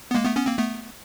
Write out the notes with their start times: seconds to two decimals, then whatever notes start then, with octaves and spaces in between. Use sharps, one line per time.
0.11 B3
0.15 G#3 A#3
0.25 A3 B3
0.36 B3 C#4
0.46 A#3 C4
0.58 A3 B3